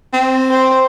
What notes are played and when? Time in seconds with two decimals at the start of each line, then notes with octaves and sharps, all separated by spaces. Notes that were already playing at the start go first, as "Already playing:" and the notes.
0.14 C4
0.51 C5